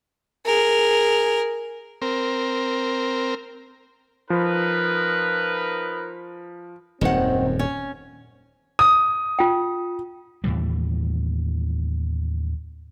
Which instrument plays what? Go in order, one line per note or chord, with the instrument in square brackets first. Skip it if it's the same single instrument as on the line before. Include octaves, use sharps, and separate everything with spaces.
[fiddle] G#4 A#4
[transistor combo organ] C4 A#4
[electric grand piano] F3 [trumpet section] D#4 A#4 B4
[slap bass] D#1 F#2 [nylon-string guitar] D#3 F#5 [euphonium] C4
[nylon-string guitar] C#4
[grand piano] D#6
[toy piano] F4 G5
[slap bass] D#2 A2 E3 G3